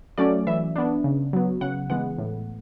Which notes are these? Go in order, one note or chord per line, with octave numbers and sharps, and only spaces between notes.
F#3 A3 C#4 D5
E3 E5
B3 D4
C#3
F#3 B3
C#3 F#5
E3 G#3 B3 F#5
A2